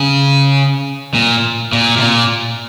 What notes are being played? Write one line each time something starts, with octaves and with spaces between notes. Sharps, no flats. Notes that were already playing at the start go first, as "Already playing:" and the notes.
Already playing: C#3
A#2
A#2
C3
A#2